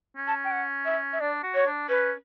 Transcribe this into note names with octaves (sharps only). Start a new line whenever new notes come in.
C#4
A5
G5
F#5
E5
E5
D4 D5
F#4
C#5
D4
C#4 B4